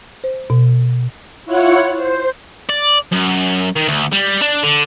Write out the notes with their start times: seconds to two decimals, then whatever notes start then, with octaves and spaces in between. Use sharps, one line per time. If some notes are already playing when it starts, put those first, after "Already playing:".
0.24 C5
0.50 B2
1.46 E4 F4 C#5 F#5
1.96 C5
2.69 D5
3.12 F#2
3.76 D#3
3.88 D2
4.12 G3
4.42 D4
4.63 D3